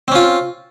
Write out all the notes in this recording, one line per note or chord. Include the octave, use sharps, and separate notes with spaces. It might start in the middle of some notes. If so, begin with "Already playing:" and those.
C4 C#4 F4